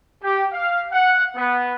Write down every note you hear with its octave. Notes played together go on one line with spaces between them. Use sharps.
G4
F5
F#5
B3